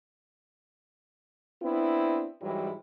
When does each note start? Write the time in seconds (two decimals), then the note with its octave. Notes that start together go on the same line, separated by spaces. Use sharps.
1.62 B3 C4 D4 E4
2.42 G#2 E3 F#3 G3 E4